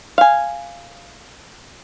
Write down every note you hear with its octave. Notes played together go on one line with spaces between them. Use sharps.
F5 G#5